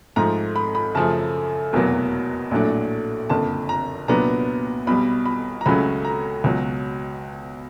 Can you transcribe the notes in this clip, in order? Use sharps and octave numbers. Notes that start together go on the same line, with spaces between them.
G#2 F3 A3 A#5
B5
B5
F#2 C#3 F3 A3 A5
F1 E2 B2 F#3 A#3
A#1 A2 F#3 A3 D4
F#1 F2 D3 A5
A#5
C2 A#2 F#3 B3 D4 A#5
B1 B2 G3 B5
B5
A#5
C#2 C#3 F#3 A3 C#4 B5
A#5
C#2 B2 F#3